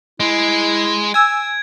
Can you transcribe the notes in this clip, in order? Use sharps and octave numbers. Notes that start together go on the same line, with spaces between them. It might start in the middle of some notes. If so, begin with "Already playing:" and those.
G#3 E4 D7
G#5 E6 G#6